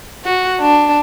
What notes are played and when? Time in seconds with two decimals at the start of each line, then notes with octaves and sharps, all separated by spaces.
0.25 F#4
0.61 D4